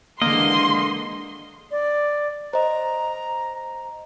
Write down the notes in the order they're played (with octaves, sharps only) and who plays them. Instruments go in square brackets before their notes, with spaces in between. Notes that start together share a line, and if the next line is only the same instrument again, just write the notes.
[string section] D3 E3 G#3 [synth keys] A#3 [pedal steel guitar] D#5 [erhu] C6
[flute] D5
[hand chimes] C5 D#5 [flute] A#5